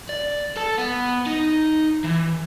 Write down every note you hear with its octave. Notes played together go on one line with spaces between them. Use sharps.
D5
A4 A5
B3
D#4
E3